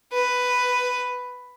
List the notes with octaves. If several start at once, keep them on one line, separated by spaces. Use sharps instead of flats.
B4